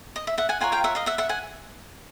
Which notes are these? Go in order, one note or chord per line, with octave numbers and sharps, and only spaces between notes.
D#5
E5
E5 F#5
F#5 G#5
F4 A#4 C#5 F#5 G#5
F5 G5
E5 F#5
D#5 F5
E5 F#5
E5 F#5
F#5 G#5